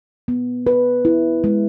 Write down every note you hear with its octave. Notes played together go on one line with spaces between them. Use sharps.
B3
B4
E4
G#3